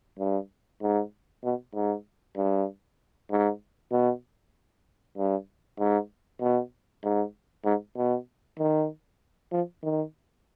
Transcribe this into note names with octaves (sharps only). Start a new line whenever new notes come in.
G2
G#2
B2
G#2
G2
G#2
B2
G2
G#2
B2
G#2
G#2
B2
D#3
F3
D#3